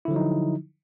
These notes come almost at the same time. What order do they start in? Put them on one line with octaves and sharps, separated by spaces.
E4 D3 F3 F#3 D#4